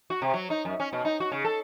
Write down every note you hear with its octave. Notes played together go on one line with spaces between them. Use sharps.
F#4
C3
F#3
D#4
F#2
C#4
B2
D#4
F#4
C#3
A4